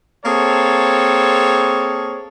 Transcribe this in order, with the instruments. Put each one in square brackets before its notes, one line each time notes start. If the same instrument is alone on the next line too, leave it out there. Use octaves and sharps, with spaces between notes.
[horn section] A#3 C4 G#4 A4 C#5